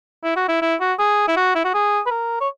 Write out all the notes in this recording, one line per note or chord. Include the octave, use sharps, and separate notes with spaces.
E4
F#4
E4
E4
F#4
G#4
E4
F#4
E4
F#4
G#4
B4
A#4
C#5